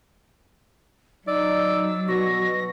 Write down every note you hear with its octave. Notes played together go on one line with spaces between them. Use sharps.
F#3 D#4 D5 E6
B2 F#4 A#6